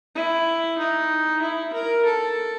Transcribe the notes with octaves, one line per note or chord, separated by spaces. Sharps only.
E4
D#4
E4
A#4
A4